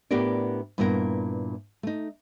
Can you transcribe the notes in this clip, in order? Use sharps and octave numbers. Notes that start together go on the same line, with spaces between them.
A2 B3 D4 G4 A#4 D5
G2 A#2 B3 E4 G#4 A#4
A3 D#4